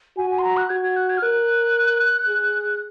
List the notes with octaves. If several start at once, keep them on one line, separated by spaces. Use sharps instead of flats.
F#4 G#5
G#5
C6
A#5
F#6
F#4 G#6
G#6
F#6
G#6
F6
A#4 F#6
G#4